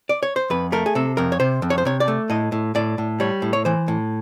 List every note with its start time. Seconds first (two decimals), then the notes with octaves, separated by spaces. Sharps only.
0.09 D5
0.23 C#5
0.36 C5
0.50 F2 B4
0.72 A3 A#4
0.86 G#4
0.95 C3 A4
1.17 F2 A#4
1.32 C#5
1.40 C3 C5
1.62 F2
1.70 C#5
1.78 C5
1.85 C3 C#5
2.00 D5
2.08 A3
2.30 A2 D#5
2.52 A2
2.75 A2 D5
2.98 A2
3.20 G3 C#5
3.42 A2
3.53 C#5
3.65 E3 C5
3.88 A2